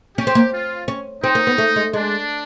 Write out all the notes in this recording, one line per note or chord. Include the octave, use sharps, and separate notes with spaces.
C#4 G4
C4
A#3
F4
C#4
C4 D#4
A#3
B3
A3
G#3
G#3 D4